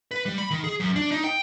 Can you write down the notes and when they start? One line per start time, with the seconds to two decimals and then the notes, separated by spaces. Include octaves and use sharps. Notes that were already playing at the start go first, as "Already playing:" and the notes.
0.11 B4
0.26 G3
0.38 B5
0.51 D#3
0.64 G#4
0.80 F#2
0.96 D4
1.11 D#4
1.24 G5